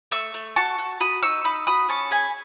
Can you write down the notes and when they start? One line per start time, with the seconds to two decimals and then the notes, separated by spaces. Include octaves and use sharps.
0.11 A3 C#6 E6
0.34 A3
0.56 F#4 A5 C#6
0.78 F#4
1.00 F#4 B5 D#6
1.23 D#4 C#6 E6
1.44 D#4 B5 D#6
1.67 F#4 B5 D#6
1.89 C#4 A5 C#6
2.11 G#4 G#5 B5